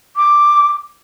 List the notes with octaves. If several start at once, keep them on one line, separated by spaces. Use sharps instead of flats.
D6